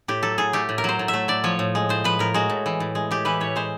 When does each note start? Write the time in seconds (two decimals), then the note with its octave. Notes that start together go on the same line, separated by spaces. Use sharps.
0.08 A2 G4
0.23 F#3 A4
0.38 A2 G#4
0.53 A3 G4
0.69 A2
0.78 A#4
0.84 F#3 C5
0.99 A2
1.08 E5
1.13 A3
1.28 A2 D5
1.44 F3 C#5
1.59 A2
1.75 G#3
1.89 A2 C5
2.04 F3 B4
2.19 A2 A#4
2.34 G#3 F#4
2.50 A2
2.66 E3
2.80 A2
2.95 G#3
3.11 A2 G4
3.25 E3 B4
3.40 A2 C#5
3.56 G#3 C5